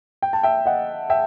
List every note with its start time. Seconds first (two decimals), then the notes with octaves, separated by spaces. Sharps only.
0.22 G5
0.33 A5
0.43 E5 G5
0.66 D#5 F#5
1.10 E5 G5